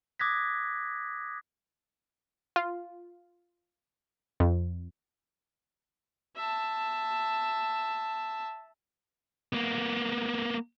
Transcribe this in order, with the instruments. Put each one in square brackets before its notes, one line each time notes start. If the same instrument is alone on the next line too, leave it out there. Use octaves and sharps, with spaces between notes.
[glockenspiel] D6 D#6 F#6 G#6 A#6 B6
[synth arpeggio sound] F4
F2
[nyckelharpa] E5 A5
[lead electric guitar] A#3 B3